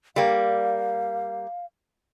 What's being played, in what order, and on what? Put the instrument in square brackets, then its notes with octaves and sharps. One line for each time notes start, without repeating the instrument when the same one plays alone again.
[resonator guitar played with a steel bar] G3 A#3 [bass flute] F5